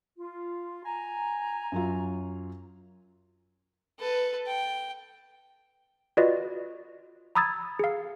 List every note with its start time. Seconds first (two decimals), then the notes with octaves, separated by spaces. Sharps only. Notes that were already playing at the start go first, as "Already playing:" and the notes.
0.18 F4
0.85 G#5 A#5
1.72 F#2 F#3 F4
4.00 A4 B4
4.47 G5
6.17 F4 F#4 B4 D5 D#5
7.35 A#5 B5 D#6 E6 G#6 A6
7.79 G#4 F5